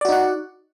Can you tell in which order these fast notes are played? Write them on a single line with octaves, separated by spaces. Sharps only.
D5 F#4 D#4 F#5